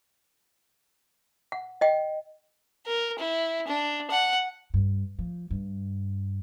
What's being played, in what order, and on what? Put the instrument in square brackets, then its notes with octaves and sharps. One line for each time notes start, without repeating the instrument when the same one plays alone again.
[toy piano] F#5
D#5 G5
[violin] A#4
E4
D4
F#5
[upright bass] G2
F3
G2